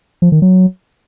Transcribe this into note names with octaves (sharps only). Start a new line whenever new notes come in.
F3
D#3
F#3